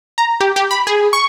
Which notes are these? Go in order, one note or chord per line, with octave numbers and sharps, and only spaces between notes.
A#5
G4
G4
B5
G#4
C#6